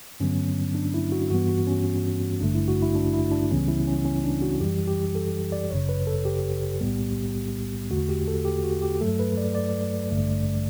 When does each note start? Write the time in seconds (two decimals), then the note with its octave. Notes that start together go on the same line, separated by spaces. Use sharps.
0.20 G2 D3 F#3 B3 C#4
0.75 D4
0.94 E4
1.12 F#4
1.30 G2 E3 G3 B3 F#4
1.49 F#4
1.67 C#4
2.41 A1 G2 D3 A3 D4
2.55 E4
2.68 F#4
2.82 E4
2.95 D4
3.13 E4
3.32 D4
3.51 C#2 C#3 E3 G3 B3 C#4
3.68 E4
3.87 C#4
4.05 C#4
4.23 D4
4.42 F#4
4.60 F#2 E3 G3 G4
4.87 G4
5.15 A4
5.52 D5
5.70 G1 F#2 C#3 C#5
5.89 B4
6.07 A4
6.25 G4
6.81 B1 A2 G3 B3
7.90 E2 D3 A3 F#4
8.09 G4
8.28 A4
8.45 G4
8.64 F#4
8.82 G4
9.01 G2 F#3 A3 A4
9.19 B4
9.37 D5
9.55 D5
10.11 A1 G2 D3 A3